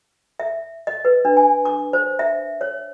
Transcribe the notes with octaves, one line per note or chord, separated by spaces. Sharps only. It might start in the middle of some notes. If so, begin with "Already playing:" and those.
E5
D#5
B4
D4
G#5
D6
C5
E5
C#5